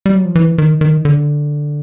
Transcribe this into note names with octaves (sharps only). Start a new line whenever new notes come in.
G3
F#3
F3
E3
D#3
D#3
D3